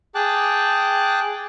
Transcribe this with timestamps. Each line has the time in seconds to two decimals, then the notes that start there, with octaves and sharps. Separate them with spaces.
0.15 G#4 G5 A5 D6 F#6